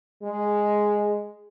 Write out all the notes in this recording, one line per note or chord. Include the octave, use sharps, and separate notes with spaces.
G#3